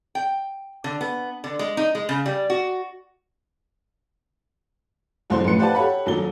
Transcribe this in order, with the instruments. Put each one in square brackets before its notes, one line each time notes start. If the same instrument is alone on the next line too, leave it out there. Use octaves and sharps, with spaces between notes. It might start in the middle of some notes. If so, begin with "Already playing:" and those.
[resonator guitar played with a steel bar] G5
D3
B3
D3
G#3
D#4
G#3
C#3
G3
F#4
[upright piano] D#1 C2 F#2 C5 C6
A1 A2 F3 B4 C6 C#7
G4 B4 C5 D5 F#5 A5
G4 A4 C#5 F#5 B5
D#1 A#2 F#3 G7